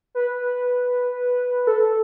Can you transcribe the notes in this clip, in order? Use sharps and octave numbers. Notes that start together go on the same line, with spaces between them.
B4
A4